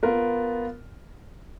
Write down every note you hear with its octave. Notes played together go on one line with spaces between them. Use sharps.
B3 F4 A#4